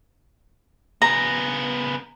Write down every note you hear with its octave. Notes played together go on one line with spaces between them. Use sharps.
C#3 B3 A#5